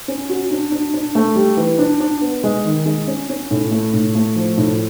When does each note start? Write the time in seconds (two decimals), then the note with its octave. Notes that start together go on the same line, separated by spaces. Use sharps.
0.08 C#4
0.29 F#4
0.50 D4
0.72 D4
0.94 D4
1.15 A3
1.36 G3
1.57 E3
1.79 D4
2.00 D4
2.21 B3
2.44 G#3
2.65 D#3
2.86 G#3
3.08 C#4
3.29 C#4
3.51 A2
3.71 A3
3.94 A2
4.15 A3
4.36 F3
4.57 A2